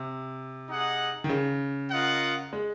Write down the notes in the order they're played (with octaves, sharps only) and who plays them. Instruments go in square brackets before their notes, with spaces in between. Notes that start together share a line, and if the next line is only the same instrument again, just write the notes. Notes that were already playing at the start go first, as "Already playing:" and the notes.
Already playing: [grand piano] C3
[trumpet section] D#4 G#4 D#5 F#5
[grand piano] D#3
C#3
[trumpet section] F4 A#4 D#5 F#5
[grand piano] G#3